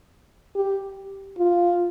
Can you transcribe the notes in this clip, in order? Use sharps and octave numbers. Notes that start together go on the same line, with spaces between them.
G4
F4